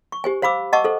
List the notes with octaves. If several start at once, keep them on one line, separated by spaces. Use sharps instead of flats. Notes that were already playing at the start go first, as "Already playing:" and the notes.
C#6
G4 C5 G#5
C5 F5 B5 D6 E6
D#5 F#5 A5 C#6 D6 E6
A4 C5